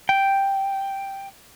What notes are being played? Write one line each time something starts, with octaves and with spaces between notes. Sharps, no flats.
G5